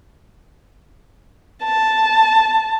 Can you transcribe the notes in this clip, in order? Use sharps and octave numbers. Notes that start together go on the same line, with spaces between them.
A5